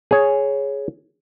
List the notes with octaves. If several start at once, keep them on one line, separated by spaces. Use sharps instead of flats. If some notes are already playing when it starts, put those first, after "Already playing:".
G#4 C#5